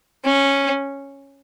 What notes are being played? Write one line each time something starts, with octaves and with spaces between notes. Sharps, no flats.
C#4